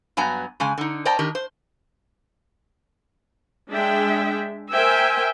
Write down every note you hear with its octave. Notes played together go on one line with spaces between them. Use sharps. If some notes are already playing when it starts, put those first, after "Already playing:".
G2 F#3 B3 G#5 A#5
C#3 G#3 G#5
D3 D#4
C5 D5 D#5 G5 A5 A#5
D#3 D4 G4 A#4
C5
G#3 D4 G#4 E5 G5
A#4 C5 E5 G5 G#5